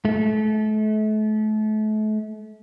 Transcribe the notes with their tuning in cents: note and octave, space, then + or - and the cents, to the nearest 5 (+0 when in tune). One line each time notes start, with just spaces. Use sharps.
A3 -35